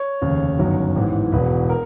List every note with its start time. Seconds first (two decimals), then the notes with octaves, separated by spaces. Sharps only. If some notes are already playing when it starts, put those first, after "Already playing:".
Already playing: C#5
0.21 F1 D#2 C#3
0.58 G1 F#2 D#3 F#3
0.95 A1 G#2 E3
1.32 E1 E2 B2 B4
1.69 A#4